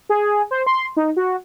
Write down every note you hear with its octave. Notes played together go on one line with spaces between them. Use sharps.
G#4
C5
C6
D#4
F#4